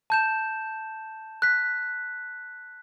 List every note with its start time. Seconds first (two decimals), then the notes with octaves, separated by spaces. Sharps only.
0.10 A5 G6 E7
1.42 F#6 B6